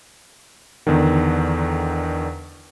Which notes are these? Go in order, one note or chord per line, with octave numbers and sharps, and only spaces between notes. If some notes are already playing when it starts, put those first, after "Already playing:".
E2 D3 D#3